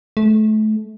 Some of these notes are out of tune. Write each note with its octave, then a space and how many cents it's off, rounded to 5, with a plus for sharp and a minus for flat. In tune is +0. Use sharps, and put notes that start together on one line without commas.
A3 -30